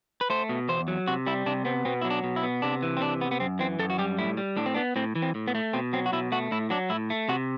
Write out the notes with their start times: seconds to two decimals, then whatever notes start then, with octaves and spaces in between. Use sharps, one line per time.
0.21 B4
0.30 A3 C5
0.49 B2
0.69 E2 C5
0.88 F#3
1.08 C3 F#4
1.27 G3 E4
1.46 C3 D4
1.65 B3 C4
1.85 B2 C4
2.02 F#3 E4
2.10 D4
2.24 B2
2.36 E4
2.43 B3
2.62 C3 D4
2.82 E3
2.97 C4
3.01 C3 D4
3.21 B3
3.31 B3
3.40 F#2 C4
3.59 E3 C4
3.79 F#2 A4
3.90 F#4
3.98 G3 G4
4.18 A2 E4
4.37 G3
4.57 A2 D4
4.66 C4
4.74 B3 D4
4.96 A2 C4
5.15 E3
5.22 C4
5.35 A2
5.48 B3
5.55 A3
5.73 B2 C4
5.93 F#3 C4
6.06 F#4
6.13 B2 E4
6.32 A3 F#4
6.51 A2 E4
6.70 F#3 D4
6.90 A2 E4
7.10 A3
7.29 C3 F#4